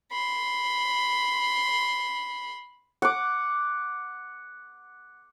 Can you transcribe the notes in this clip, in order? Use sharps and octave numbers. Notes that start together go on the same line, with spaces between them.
B5 C6
F#5 D6